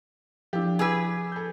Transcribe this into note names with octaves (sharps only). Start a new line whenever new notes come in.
F3 D4 E4 G4
G#4 B4 D6 E6 G#6
A4 G6